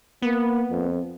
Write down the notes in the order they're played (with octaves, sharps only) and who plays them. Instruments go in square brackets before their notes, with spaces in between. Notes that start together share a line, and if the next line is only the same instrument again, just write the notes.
[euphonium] A#3 [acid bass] B3
[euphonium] F2